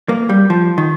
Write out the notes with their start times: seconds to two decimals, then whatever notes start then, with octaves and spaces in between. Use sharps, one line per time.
0.09 A#3
0.29 G3
0.50 F3
0.78 D#3